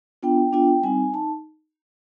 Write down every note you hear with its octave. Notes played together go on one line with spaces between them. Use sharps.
B3 D4 F4 G5
B3 D4 F4 G5
G3 C4 D#4 G#5
D#4 A5